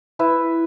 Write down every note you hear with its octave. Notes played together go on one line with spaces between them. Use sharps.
E4 B4 E5